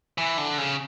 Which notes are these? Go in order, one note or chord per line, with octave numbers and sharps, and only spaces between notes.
E3
D3
C#3